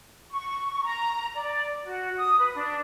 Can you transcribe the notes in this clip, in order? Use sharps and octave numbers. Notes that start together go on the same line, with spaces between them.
C#6
A#5
D5
F#4
D#6
B4
D4